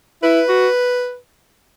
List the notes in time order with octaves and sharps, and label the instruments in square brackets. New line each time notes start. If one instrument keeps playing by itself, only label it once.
[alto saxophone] E4 [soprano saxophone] B4
[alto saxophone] F#4